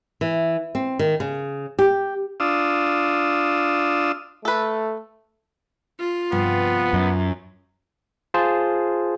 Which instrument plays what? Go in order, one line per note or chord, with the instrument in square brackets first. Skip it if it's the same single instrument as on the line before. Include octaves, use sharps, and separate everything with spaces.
[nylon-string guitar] E3
C4
D#3
C#3
G4
[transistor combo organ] D4 F4 D#6 E6
[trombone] A3 [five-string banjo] A4 B4
[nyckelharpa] F4
[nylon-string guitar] G2 C3 F3 [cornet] B3
[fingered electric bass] F#2
[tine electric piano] F4 G#4 C5 A5